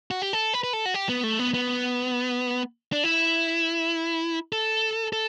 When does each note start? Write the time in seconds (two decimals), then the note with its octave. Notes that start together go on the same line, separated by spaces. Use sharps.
0.11 F#4
0.22 G4
0.33 A4
0.54 B4
0.64 B4
0.73 A4
0.86 F#4
0.94 G4
1.09 B3
1.23 A3
1.39 B3
1.54 B3
2.92 D4
3.04 E4
4.52 A4
5.13 A4